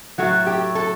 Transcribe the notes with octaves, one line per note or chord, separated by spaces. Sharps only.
A2 F#3 A3 F#4
G4
A4